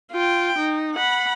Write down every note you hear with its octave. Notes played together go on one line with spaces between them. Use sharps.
F4 G5
D#4
F#5 B5